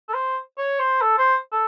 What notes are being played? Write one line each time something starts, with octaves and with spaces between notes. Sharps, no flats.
A4
C5
C#5
C5
A4
C5
A4